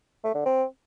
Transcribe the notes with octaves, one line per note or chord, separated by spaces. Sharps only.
A3
D3
C4